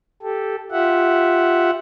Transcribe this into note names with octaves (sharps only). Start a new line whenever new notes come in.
G4 A4
F4 G4 E5 F#5